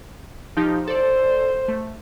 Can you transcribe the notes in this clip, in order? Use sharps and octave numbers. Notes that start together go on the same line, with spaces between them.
F3 D#4 G4
A4 C5 D5
A3